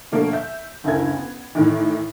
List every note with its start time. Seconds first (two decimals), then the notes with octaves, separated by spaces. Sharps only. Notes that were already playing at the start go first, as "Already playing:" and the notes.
0.12 B2 D3 F3 A3 A#3
0.32 E5 G6
0.84 F#1 D2 E4 A#4 G#6
1.18 B3
1.55 A2 D#3 E3